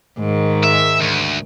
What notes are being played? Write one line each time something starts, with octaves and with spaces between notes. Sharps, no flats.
G#2 D#3 G#3
E5
D2